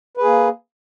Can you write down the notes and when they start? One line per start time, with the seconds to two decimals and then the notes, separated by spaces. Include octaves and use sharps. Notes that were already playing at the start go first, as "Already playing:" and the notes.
0.17 B4
0.21 G#4
0.24 A#3